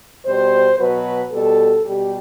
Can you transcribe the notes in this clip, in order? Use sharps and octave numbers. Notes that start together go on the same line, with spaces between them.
B2 G3 C5
B2 F#3 B4
B2 G3 A4
B2 G3 G4